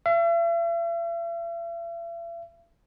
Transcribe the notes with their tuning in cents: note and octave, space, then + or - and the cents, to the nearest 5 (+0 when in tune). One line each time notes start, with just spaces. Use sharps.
E5 +45